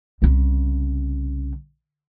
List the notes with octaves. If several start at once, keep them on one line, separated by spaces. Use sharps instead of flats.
C2 C#3